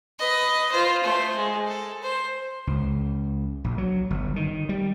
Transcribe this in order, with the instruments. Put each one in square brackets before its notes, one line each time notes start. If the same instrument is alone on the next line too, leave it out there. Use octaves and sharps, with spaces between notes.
[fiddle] B4 D#5
F4 C5
A3 C5
G#3
A4
C5
[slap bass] C#2
A#1
F#3
G1
D#3
G3